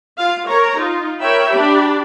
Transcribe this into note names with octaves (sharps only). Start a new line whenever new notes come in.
F4 F5
A#4 C#5 A#5
D#4 F4
A#4 C#5 E5 G5 B5
D4 G4 B5